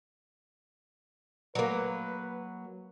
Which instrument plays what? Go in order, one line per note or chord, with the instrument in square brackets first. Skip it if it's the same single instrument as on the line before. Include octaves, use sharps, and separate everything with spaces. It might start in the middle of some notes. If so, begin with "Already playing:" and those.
[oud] F#3 A#3 [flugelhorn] B4